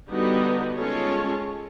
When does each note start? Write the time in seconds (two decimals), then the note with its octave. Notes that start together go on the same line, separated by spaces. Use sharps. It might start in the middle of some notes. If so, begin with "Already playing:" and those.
0.10 D3 G3 B3 D#4 F#4
0.77 G#3 C#4 F4 A4 C#5